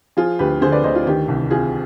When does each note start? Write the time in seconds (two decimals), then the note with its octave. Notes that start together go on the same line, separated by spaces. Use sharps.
0.17 F3 F4 G#4
0.39 D2 G4 B4
0.61 D3 G#4 C5
0.72 B4 D5
0.84 D2 C5 D#5
0.95 F4
1.07 D#3 G4
1.28 C2
1.51 C3 F4 G#4